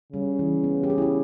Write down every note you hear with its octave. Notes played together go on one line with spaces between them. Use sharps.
C#3 G3
E3
B3
G4
G#4
E4
G4